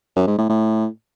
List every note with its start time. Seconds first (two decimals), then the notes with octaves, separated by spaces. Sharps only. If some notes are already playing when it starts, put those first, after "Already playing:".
0.16 F#2
0.27 G#2
0.39 A2
0.50 A2